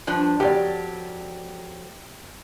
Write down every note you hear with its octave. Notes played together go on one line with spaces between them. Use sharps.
G2 F3 D4
F2 F#3 G4 D5